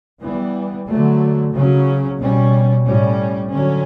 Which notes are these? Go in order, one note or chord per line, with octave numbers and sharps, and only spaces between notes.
E3 G3 B3
D3 F#3 A3
C#3 F#3 C#4
B2 G3 C#4
A2 G3 C#4
D3 F#3 C#4